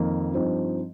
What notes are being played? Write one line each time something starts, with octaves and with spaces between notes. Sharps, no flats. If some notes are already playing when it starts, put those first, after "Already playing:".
Already playing: F2 D#3 A#3
G2 F3 C4 D#4